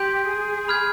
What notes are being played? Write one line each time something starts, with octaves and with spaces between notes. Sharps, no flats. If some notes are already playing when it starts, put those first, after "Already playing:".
Already playing: G4 C6 G6 D7
G#4
B5 F6 G#6